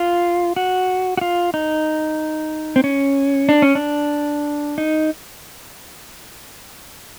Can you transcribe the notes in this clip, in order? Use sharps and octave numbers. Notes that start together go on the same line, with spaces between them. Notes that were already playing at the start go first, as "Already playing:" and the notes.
Already playing: F4
F#4
F#4
F4
D#4
C4
C#4
D4
C#4
D4
D#4